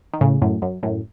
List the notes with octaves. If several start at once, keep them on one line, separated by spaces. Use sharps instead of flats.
D#3
A2 C#3
F#2 A2
F#2
F#2 A2